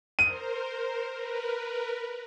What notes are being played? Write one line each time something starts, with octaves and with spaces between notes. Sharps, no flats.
A#4 C5 D#7
A#4 B4